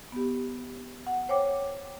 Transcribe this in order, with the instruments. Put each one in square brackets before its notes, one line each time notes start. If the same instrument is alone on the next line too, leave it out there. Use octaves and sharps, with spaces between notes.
[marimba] B3 G4
F#5
C5 C#5 G5 D6